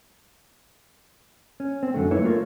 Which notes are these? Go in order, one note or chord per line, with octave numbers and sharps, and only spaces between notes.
C#4
C4
F#2 D3 A3
A#3 D#4 E4 B4 C#5
A3 F4 A#4 C#5